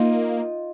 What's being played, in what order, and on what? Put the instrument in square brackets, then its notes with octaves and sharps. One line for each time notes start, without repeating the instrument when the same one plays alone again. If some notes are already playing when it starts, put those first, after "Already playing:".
Already playing: [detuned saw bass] A#3 [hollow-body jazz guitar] D#4 F4